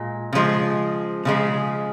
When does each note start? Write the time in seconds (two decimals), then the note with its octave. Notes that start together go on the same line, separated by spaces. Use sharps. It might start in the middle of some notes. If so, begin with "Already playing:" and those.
Already playing: A#2 G#3
0.33 C#3 F3 G#3
1.25 C#3 F3 G#3